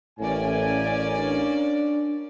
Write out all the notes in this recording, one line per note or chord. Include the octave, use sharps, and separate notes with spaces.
A1 A2 A#3 C#4 D5 G#5
D4